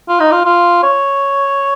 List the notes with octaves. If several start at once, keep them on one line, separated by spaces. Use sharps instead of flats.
F4
D#4
F4
F4
C#5